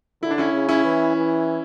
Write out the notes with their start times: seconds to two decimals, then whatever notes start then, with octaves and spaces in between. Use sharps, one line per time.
0.23 D3 E4
0.31 D4
0.38 C#4 E4
0.53 C#3
0.69 C#4 E4
0.85 E3
1.16 E3